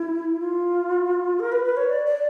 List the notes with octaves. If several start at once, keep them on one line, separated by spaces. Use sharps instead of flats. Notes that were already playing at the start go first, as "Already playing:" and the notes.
Already playing: E4
F4
A#4
B4
B4
C#5
D5
D5